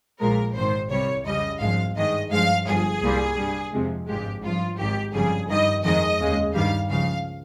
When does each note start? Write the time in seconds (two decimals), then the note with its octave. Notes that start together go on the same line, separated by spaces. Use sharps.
0.20 A#1 A#2 F3 G#3 A#4
0.55 G#1 G#2 D#3 C5
0.90 C2 C3 G3 C#5
1.26 F2 C#3 G3 D#5
1.60 G#1 G2 F3 G#3 F5
1.96 G2 D#3 G#3 D#5
2.31 G2 F3 G#3 F5
2.67 G1 G2 F3 G#4
3.01 C2 A#2 G3
3.37 G2 G3
3.73 F2 C3 F3 G#3
4.07 G#1 G2 F3 G#3 G4
4.42 G#1 G2 F3 F4
4.78 G#1 G#2 D#3 G4
5.14 G1 F2 C#3 G3 G#4
5.49 G2 D#3 G3 D#5
5.84 F2 D#3 G#3 D#5
6.19 D#2 C#3 G#3
6.54 G2 D#3 G3 F5
6.89 C#2 C#3 F3 F5